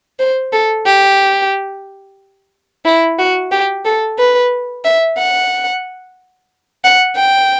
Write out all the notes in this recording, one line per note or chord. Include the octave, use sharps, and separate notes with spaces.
C5
A4
G4
E4
F#4
G4
A4
B4
E5
F#5
F#5
G5